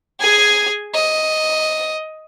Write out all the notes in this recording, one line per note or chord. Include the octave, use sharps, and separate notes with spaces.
G#4 G#5
D#5